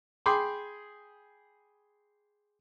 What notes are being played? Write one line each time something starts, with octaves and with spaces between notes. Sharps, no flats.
G#4 G5 B5 C6 D6